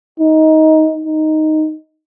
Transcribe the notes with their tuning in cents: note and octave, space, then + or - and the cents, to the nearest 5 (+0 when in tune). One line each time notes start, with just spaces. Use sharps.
D#4 +15
D#4 +0